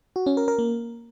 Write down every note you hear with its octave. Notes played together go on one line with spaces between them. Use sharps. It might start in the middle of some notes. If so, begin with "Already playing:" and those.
F#4
C#4
A#4
A#4
A#3